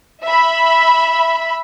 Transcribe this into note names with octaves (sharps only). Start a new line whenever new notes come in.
E5 B5